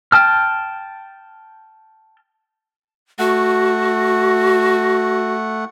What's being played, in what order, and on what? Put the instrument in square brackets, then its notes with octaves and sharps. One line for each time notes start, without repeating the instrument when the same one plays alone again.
[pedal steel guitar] G5 A5 F6
[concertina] A3 F#5 [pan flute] F#4